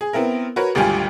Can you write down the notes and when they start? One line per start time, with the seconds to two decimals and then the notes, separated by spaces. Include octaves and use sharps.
0.01 G#4
0.13 B3 C4 E4 A#4
0.56 F#4 A#4 B4 C#5
0.75 G#1 D2 G3 F4 G5 G#5